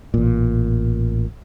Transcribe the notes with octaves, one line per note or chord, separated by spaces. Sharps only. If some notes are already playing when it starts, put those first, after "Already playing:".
A1 A#2